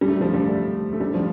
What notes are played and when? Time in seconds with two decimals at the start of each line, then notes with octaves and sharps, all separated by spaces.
0.01 G3
0.08 A3
0.21 F3
0.34 G3
0.47 A3
0.93 A3
1.00 G3
1.14 F3